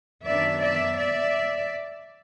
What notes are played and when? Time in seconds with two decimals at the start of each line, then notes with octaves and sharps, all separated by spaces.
0.25 F#2 D#3 F#3 B3 D4 D5 E5
0.62 D5 E5
0.99 D5 E5